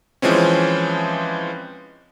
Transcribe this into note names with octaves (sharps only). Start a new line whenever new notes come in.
E3 F3 G#3 C4 C#4